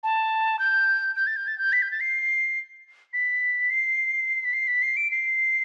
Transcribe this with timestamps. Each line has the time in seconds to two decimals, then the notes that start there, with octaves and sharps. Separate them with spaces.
0.03 A5
0.59 G6
1.16 G6
1.27 A6
1.36 G6
1.47 A6
1.58 G6
1.72 B6
1.82 G6
1.91 A6
2.00 C7
3.13 B6
3.70 C7
4.45 B6
4.53 C7
4.67 B6
4.82 C7
4.97 D7
5.11 C7